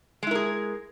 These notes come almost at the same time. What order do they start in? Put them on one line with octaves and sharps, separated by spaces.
G#3 E4 A#4 G#4